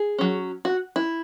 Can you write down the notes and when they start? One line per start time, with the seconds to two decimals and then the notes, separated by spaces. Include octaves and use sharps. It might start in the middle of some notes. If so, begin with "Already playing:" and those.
Already playing: G#4
0.19 F#3 C#4
0.65 F#4
0.96 E4